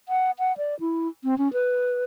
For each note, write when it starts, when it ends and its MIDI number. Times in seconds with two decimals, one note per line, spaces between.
0.09 0.31 78
0.39 0.56 78
0.58 0.78 74
0.80 1.08 64
1.24 1.37 60
1.38 1.51 61
1.53 2.04 71